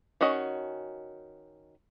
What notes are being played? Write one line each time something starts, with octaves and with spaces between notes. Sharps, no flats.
D#3 C#4 F#4 D#5